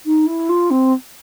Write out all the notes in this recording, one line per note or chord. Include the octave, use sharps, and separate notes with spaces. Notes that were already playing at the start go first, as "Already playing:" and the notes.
D#4
E4
F4
C4